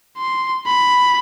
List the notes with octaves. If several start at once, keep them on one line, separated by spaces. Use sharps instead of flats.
C6
B5